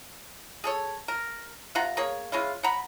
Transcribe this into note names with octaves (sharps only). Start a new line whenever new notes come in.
G#4 A4 C#5
A#4
C3 F4 F#5 A#5
A#3 G#4 C#5
G#3 C#4 E4 F4
F#5 A#5 B5